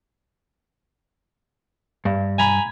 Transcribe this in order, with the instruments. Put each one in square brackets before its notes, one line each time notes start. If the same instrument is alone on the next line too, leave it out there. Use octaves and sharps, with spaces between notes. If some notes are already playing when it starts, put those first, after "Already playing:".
[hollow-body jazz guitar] G2
[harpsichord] G#5 A#5 B5